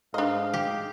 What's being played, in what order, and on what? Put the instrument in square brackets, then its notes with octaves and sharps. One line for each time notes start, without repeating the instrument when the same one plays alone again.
[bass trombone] G#2 [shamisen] D4 D#5 [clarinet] F5
[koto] G4